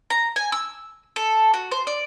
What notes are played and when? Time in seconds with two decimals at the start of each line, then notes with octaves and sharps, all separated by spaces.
0.10 A#5
0.36 G#5
0.52 E6
1.16 A4
1.54 F#4
1.71 C5
1.87 D5